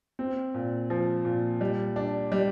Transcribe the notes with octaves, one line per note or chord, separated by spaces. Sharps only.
C4
A#2
F3
A#2
G3
D4
G3